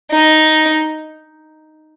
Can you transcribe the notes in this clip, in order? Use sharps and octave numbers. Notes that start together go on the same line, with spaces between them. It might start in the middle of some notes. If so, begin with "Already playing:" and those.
D#4